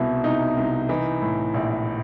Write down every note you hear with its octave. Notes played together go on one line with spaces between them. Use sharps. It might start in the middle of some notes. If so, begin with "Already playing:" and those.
Already playing: C2 B2 E4
C2 D#4
C2
E3 D#4
A2
A#1